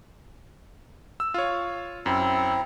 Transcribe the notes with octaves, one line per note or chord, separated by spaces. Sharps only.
E6
F4 C#5
F#2 C4 E4 A#5